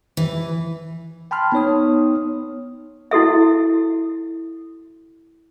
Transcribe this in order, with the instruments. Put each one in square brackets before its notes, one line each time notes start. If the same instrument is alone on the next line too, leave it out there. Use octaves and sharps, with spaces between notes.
[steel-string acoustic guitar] E3
[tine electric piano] G5 A5 B5 C6 F6
B3 D#4 C#5 D#6
[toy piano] E4 F#4 A4 E5